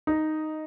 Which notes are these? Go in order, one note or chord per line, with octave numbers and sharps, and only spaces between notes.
D#4